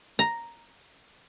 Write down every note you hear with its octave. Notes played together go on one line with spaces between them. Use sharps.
A#5